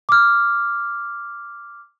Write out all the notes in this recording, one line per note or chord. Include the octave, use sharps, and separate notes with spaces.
D6 F6